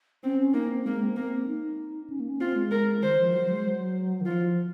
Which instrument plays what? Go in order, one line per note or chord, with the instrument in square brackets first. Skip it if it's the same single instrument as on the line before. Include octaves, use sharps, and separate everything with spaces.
[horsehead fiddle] C4 [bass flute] C#4
[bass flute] C#4
[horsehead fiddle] A#3 [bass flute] D#4
[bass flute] C4
[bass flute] G#3 [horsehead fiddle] A#3
[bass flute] C4
[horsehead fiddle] A#3
[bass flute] D#4
C#4
A#3
C#4
[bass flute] C4 [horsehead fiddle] F4
[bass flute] G#3
[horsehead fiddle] A#4
[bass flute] D#3 [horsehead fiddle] C5
[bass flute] F3
[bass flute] F#3 [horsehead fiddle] C5
[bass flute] G#3
F#3
D#3
[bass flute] F3 [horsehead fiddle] F4